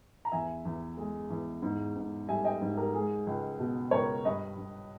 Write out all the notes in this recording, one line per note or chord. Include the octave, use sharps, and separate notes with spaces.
A#5
E2 E5 G#5
E2
G#3
E2
G#2
G#2
G3 E5 G#5
D#5 G5
G#2
G4 A#4
G#3 G#4
C#2
B2
C#2 A#4 C#5
G2 B4 D#5
G2